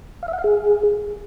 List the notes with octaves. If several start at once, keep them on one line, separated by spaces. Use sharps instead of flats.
F5
E5
F#5
F5
G#4